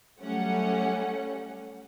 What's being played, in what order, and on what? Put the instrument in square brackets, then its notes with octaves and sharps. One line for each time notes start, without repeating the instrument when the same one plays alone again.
[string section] F#3 G3 A3 C#4 F#5